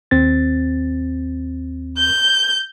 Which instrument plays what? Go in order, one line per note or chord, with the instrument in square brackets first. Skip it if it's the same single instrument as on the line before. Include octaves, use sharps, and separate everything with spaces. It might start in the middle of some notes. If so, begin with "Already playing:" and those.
[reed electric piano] D#2 C4 A6
[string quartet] G6